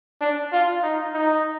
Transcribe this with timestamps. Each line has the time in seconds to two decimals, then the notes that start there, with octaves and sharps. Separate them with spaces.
0.21 D4
0.53 F4
0.83 D#4
1.14 D#4